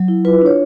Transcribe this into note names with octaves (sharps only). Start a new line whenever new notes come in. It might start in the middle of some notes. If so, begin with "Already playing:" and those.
Already playing: F#3
E4
F4 B4
D4 C#5